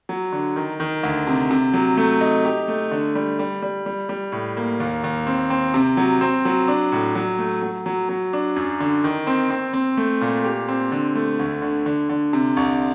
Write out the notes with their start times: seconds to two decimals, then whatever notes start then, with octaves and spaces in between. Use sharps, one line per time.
0.09 F#3
0.32 D3
0.56 D#3
0.80 D#3
1.03 D2
1.27 C3
1.50 C3
1.74 F#3
1.97 A3
2.21 D#4
2.45 G4
2.68 A3
2.91 D3
3.15 G3
3.39 G3
3.62 G3
3.86 G3
4.09 G3
4.32 A2
4.57 A#3
4.80 D#2
5.04 D#2
5.27 C4
5.50 C4
5.74 C3
5.97 F#3
6.21 C4
6.45 F#3
6.68 D4
6.92 A2
7.15 F#3
7.39 A3
7.62 F#3
7.86 F#3
8.09 F#3
8.33 D4
8.56 F#2
8.80 D3
9.04 D#3
9.27 C4
9.50 C4
9.74 C4
9.97 A3
10.21 A#2
10.44 G4
10.68 C4
10.91 D3
11.15 A3
11.39 D2
11.62 D3
11.86 D3
12.09 D3
12.33 C3
12.57 C2